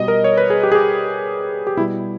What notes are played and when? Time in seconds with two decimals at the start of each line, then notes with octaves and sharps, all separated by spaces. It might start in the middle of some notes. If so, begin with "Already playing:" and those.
Already playing: B2 G3 D#5
0.08 A#4
0.24 C#5
0.38 B4
0.50 G#4
0.63 G4
0.72 G#4
0.75 G4
1.67 G4
1.77 B2 E4
1.80 G3